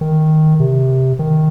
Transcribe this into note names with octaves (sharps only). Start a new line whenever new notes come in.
D#3
C3
D#3